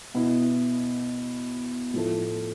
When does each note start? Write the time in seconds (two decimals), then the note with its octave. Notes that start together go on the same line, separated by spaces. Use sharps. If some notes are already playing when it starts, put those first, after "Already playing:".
0.14 B2 B3 E4
1.94 A2 F3 A3